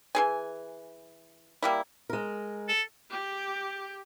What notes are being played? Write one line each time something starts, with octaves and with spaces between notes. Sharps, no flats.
E3 G#4 G#5
G3 A#3 E4
G#3 A#4
A4
G4